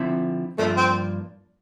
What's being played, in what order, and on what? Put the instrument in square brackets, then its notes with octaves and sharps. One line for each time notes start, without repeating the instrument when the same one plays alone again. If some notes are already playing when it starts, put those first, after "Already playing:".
Already playing: [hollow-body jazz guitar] D3 F3 C4 E4
[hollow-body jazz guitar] G2 F3 A#3 D4 F4 [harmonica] A3
[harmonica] C4